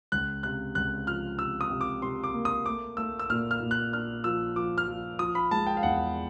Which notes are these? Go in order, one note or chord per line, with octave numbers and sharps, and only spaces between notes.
C#2 F#6
C3 F#6
C#2 F#6
F3 F6
C3 E6
D#6
C3
D6
C3 C6
D6
A#3
D#6
A3 D6
A3 E6
E6
A#2 F6
F6
A#2
F#6
D4 F6
F3 E6
F3 D6
F6
F3
F3 D#6
B5
G#3 A5
G5
F5
E2 F#5